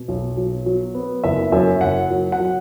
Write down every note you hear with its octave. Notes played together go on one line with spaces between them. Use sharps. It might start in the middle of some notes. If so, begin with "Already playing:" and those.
Already playing: B2
B1
F#3
F#3
B3
F#1 E5
F#2 E5
F#1 F#5
F#3
F#5
F#3